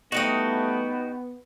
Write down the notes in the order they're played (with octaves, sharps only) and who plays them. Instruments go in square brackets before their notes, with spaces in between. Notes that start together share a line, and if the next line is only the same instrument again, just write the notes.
[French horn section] E3 G3 A3 [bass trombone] B3 [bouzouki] D#4 G4 D#5 [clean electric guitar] F#4